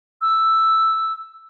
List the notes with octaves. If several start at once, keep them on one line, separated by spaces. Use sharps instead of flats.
E6